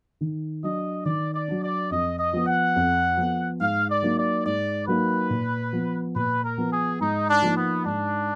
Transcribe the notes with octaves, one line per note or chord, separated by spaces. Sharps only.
D#3
F#3 D4 D#5
D#3 D5
D5
F#3 D4
D5
F2 D#5
D#5
F3 B3
F#5
F2
F3 B3
G#2 F5
D5
F#3 A#3 D#4
D5
G#2 D5
F#3 A#3 D#4 B4
A#2
F3 B3
A#2 B4
A#4
F3 B3
G#4
G#2 D#4
D4
F3 A#3 D#4
B3
G#2 D4